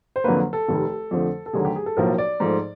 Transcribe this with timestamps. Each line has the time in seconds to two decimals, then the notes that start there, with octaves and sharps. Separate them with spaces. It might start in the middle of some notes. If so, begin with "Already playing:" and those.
0.16 C5
0.24 F2 D3 F#3 A#3 B4
0.53 A4
0.68 F1 D#2 D#3
1.11 F2 D3 F3 A3
1.46 A4
1.53 F1 D#2 D3 F#3 A3 G#4
1.65 G4
1.76 G#4
1.86 A4
1.97 B1 A2 F3 A#3 A#4
2.18 D5
2.40 G#2 F3 A3